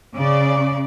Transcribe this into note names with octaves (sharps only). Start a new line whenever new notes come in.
C#3 D5